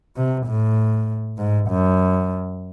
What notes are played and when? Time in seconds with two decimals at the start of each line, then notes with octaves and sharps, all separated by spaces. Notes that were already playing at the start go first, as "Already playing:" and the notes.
0.16 C3
0.47 A2
1.38 G#2
1.69 F#2